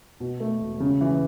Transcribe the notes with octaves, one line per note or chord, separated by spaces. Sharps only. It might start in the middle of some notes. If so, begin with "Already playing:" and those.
B2
A3
E1
C#3
E3